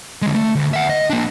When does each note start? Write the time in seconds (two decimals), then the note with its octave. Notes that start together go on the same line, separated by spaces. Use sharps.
0.22 D3 G#3
0.34 A3
0.55 D2
0.74 E5 F#5
0.89 D#5
1.10 A#3 D4